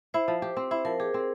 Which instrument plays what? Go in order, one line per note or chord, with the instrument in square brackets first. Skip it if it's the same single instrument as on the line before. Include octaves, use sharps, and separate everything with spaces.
[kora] E4 [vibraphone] C5
[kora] F3
G4
C4
[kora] E4 [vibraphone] C5
[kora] F3 [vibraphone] A#4
[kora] G4 [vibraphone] G#4
[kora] C4